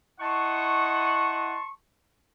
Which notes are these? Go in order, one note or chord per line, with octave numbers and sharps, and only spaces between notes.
E4 D#5 F#5 A5 C6 C#6